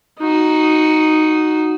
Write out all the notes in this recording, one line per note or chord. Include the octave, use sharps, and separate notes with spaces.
D#4 F#4